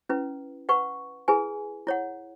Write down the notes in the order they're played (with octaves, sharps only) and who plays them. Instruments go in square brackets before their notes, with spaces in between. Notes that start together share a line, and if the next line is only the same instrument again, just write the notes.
[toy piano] C#4 E4 B4
B4 F#5 C#6
E4 G#4 B4 G#5
E4 C#5 F#5